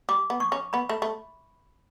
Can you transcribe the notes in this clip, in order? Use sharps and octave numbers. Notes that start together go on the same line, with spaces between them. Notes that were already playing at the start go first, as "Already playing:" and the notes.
G3 D6
B3
C#6
C#4
B3 B5
A3
A3